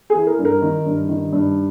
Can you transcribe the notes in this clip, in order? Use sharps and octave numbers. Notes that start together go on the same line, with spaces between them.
G#4
E3
A#4
G2
A#4
D#3
G2
D#3
G2